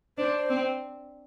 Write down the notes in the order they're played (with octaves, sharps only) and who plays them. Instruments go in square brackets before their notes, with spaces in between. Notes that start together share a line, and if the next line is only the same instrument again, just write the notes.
[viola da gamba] D4 [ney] C5
[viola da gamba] C4